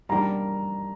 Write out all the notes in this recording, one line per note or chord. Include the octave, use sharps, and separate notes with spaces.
G3 A#3 D4 G4 A#5